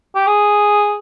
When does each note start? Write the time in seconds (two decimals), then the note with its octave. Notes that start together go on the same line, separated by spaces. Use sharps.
0.15 G4
0.27 G#4